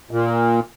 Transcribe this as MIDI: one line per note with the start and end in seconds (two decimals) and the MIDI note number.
0.11 0.60 46